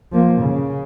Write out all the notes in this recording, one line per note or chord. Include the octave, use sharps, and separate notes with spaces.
F3 A#3
C#3